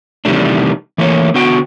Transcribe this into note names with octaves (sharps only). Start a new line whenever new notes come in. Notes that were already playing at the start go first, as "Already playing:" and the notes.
C3 D#3 E3 G3 A3 D4
E3 A3 A#3 C#5
D3 B3 F#4 G5